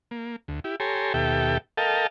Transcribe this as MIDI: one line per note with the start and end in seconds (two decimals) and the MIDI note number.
0.11 0.36 58
0.48 0.60 38
0.64 0.76 64
0.64 0.76 67
0.80 1.13 67
0.80 1.13 69
0.80 1.13 73
0.80 1.13 80
0.80 1.13 82
0.80 1.13 84
1.14 1.58 39
1.14 1.58 47
1.14 1.58 67
1.14 1.58 69
1.14 1.58 76
1.14 1.58 79
1.77 2.07 69
1.77 2.07 70
1.77 2.07 75
1.77 2.07 77
1.77 2.07 79
1.77 2.07 81